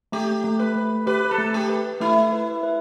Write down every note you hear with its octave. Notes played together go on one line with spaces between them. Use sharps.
A3 G4
A3
B4
A3
G4 B4
A4
A3
G4
B4
A3 E4
B4
B4